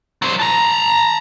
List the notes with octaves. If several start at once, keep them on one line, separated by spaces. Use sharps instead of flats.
F#3 C5
A5 A#5